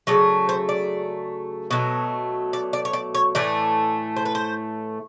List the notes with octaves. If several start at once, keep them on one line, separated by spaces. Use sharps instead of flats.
C#3 F#3 A3 D5
C5
D5
B2 F#3 A3
D5
D5
C#5
D5
C#5
A2 E3 A3 D5
C5
B4
C5